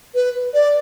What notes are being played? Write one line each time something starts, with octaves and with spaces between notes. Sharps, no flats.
B4
D5